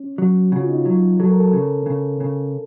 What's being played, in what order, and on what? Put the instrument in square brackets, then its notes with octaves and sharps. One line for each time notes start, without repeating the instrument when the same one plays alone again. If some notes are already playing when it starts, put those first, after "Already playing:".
Already playing: [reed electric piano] C#4
[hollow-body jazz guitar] F#3
[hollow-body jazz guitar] C#3 [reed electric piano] F#4
[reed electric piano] F4
D#4
F4
[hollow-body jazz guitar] F#3
[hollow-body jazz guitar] F#3 [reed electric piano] A4
[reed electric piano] A#4
A4
[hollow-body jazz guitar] C#3
C#3
C#3